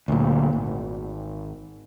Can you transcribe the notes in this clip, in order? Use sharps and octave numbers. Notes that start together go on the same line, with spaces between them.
D2 A#2
G#1